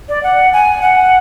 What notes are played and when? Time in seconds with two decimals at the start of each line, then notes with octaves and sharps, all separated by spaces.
0.09 D5
0.23 F#5
0.53 G#5
0.82 F#5